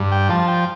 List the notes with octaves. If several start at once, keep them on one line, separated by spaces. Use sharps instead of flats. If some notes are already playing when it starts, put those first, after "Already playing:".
Already playing: G2
G5
F3 A5
G5